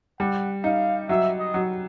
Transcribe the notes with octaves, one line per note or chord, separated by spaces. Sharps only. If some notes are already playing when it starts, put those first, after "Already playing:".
G3 F#5
D#4 F5
F#3 E5
D#5
F#3